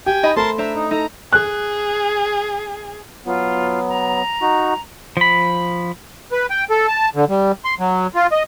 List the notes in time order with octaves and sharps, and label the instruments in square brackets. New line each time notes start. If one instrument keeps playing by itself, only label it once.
[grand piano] G4 [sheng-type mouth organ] G5 G#5
[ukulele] D#4 D#5 B5
[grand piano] A3 B5 [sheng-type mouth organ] A#4 A5 C6 [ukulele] C5
[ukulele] D4 C5 A#5 [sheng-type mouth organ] E5
[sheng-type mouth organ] D#4
[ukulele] D#4 A4 [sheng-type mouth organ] A#5
[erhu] G#4 [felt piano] F#6
[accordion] F#3 B3 [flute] F4
[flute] A#5
[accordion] D#4 F#4
[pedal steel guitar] F3 B5
[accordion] B4
G5
A4
A5
D3
G3
C6
F#3
F4
D#5